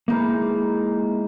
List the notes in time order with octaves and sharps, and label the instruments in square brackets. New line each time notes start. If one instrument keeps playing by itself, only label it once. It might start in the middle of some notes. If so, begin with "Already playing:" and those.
[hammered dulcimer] E3 G#3 D#4 [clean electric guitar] A#3